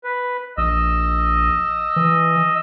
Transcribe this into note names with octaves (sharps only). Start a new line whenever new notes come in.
B4
A#1 D#5 E6
E3